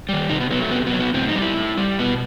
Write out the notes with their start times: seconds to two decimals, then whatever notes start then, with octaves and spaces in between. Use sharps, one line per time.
0.09 D#3 G3
0.29 C3 D#4
0.41 B3
0.51 F#3 B3
0.62 A3
0.71 C3 B3
0.86 B3
0.93 F#3
1.00 B3
1.14 A2 C4
1.29 D#4
1.35 G3
1.42 E4
1.57 A2
1.77 G3
1.99 B2 B3